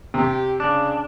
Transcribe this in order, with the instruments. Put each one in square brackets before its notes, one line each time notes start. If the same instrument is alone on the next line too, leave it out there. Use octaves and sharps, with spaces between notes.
[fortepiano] C3 [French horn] G4
[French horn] C#3 [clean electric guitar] D4